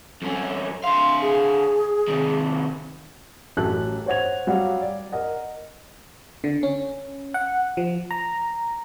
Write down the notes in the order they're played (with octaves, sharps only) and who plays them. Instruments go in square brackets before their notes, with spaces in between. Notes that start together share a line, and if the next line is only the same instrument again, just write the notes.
[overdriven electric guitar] F2 C#4 [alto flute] A4
[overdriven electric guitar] D3 F5 [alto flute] C6
[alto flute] G#4
[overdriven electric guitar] C3 D#3
[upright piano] A1 F#2 G4 A4 F#6
C5 C#5 F#5 G#6 F7
F#3 G3 F5 F#5
D5
A#4 D#5 F#5
[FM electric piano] D3
C#4
F#5
F3
A#5